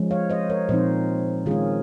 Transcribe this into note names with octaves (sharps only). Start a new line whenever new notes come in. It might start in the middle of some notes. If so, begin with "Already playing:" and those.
Already playing: F3 G#3 C#4
C#5 F5
C5 D#5
A#4 C#5
A#2 F3 C4 D#4 C5 D#5
D#3 G#3 C#4 F4 G#4